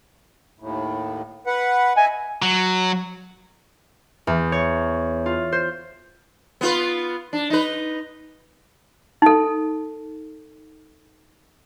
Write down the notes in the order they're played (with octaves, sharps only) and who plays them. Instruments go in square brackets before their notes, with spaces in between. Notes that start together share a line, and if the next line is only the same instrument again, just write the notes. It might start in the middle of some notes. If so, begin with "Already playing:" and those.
[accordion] D#2 A2
B4 F#5
[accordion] D#5 E5 [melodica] G#5
[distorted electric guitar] F#3
[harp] E2
C#5
F4
C5
[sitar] B3 F4 B4
D4
D#4 B4
[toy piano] D#4 A4